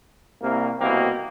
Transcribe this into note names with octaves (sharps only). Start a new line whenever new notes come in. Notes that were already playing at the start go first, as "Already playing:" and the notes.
C2 A#3
C2 B2 A#3 C4